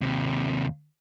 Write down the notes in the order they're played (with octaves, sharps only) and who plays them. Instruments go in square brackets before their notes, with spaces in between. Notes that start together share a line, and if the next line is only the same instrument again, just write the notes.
[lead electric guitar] D#2 C3